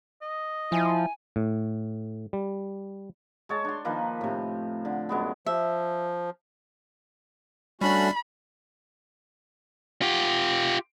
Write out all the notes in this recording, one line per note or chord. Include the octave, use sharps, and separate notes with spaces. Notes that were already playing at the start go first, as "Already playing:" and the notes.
D#5
F3 E4 G#5
A2
G3
G#3 C#5 A5
D4 C6
D#3 F3 A#3 B4
A2 C3
D3
F#2 G#3 B3
F3 E5
G3 A3 C#4 D4 F#4 D5 B5
F4 G4